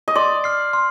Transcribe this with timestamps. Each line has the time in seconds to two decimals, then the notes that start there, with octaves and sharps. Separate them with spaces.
0.08 D#5
0.15 D5 C6
0.44 F6 C7
0.73 C6